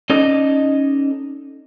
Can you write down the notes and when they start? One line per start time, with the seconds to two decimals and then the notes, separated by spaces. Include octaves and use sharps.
0.10 C#4 D#4 A4 D5 D#5